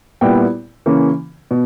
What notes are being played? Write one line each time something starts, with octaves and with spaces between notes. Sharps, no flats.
A#2 G3 B3 E4 G5
C#3 E3 A#3 C#4
B2